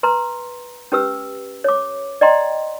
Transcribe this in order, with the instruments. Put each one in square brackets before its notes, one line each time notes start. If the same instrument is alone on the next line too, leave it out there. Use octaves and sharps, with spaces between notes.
[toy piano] B4 A#5 C6
C#4 G4 B4 E6
C#5 D6
D5 D#5 G5 A#5 C6